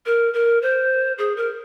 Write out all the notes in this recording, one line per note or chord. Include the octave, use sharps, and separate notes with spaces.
A#4
A#4
C5
G#4
A#4